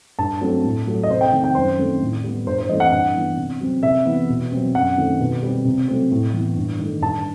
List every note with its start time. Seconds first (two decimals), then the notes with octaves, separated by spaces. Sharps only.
0.18 G2 A5
0.41 F#3 A3 C4
0.64 A2
0.87 F#3 A3
1.03 D#5
1.10 C3 C5
1.21 G5
1.32 D#3 A3 C4
1.44 G5
1.55 F#2 C5
1.78 D#3 A3 C4
2.01 A2
2.24 G3 B3
2.47 G2 C5
2.58 C5
2.69 E3 A3 C4 D#5
2.80 F#5
2.92 G2 F#5
3.14 E3 B3
3.37 C3
3.60 F#3 C4
3.83 C3 E5
4.05 E3 B3
4.29 B2
4.52 F#3 C4
4.75 F#2 F#5
4.98 D#3 A3 C4
5.19 B2
5.43 G3 C4
5.65 C3
5.88 F#3 A3 C4
6.11 A2
6.33 E3 B3
6.56 G2
6.79 D#3 A3
7.02 G2 A5